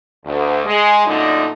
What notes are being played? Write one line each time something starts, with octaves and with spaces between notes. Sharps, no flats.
D2
G#3 G#4
F#2 A#2 D3 A3 D#4